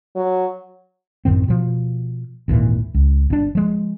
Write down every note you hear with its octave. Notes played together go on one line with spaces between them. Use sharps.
F#3
A1 F#2 D#3 C4
B2 F3
G#1 D#2 A#2 E3
C#2
G1 D4
F3 G#3